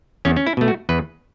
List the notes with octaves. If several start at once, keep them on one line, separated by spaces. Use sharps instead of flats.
E2 C#4
C#4
E4
B2 A3
F#4
E2 B4